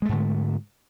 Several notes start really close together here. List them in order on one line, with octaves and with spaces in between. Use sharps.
G#3 A3 G#2 D3